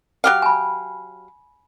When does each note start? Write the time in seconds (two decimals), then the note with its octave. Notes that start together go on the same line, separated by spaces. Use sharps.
0.24 F#3 G4 F5
0.42 G#5 B5